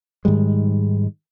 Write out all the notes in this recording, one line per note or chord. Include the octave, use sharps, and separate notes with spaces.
G#2 D#3 G3 G#3